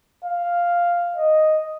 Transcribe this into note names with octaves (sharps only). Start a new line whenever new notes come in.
F5
D#5